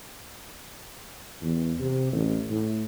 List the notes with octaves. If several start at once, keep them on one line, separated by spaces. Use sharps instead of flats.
E2
C3
A1
A2